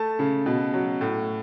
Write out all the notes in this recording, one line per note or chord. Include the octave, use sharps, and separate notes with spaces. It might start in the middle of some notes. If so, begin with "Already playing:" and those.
Already playing: A3 A5
C#3
B2
F#3
A2